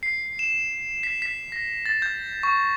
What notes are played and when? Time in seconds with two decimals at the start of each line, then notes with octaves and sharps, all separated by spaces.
0.03 C7
0.39 E7
1.03 B6
1.22 B6
1.52 A#6
1.86 A6
2.02 G6
2.43 C#6